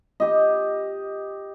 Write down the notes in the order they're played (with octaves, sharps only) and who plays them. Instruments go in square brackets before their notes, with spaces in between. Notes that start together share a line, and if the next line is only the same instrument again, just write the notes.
[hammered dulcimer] G4 D#5